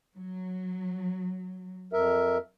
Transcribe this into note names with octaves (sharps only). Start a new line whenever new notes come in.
F#3
F2 A#4 E5